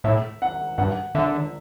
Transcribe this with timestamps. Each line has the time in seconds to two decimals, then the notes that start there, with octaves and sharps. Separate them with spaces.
0.04 A2 E5
0.42 F#5
0.78 G2 F#5
1.15 D3 E5